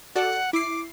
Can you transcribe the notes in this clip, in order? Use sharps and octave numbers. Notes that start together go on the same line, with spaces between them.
F#4 A4 D5 F#5
E4 D6 C7